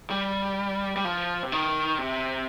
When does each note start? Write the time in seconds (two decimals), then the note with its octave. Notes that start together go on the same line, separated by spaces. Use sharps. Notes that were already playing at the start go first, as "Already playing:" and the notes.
0.10 G3
0.96 G3
1.05 F3
1.43 C3
1.52 D#3
1.99 C3